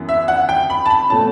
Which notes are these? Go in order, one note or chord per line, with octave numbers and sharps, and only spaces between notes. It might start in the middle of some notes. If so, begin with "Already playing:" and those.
Already playing: F#2 E3 B3
E5
F#5
G5
B5
A5
B5
B2 A3 C#4 A5